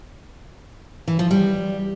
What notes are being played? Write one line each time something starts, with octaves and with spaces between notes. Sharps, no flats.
E3
F3
G3